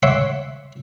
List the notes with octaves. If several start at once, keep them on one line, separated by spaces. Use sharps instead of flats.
C#5 E5 F#5 C6 D6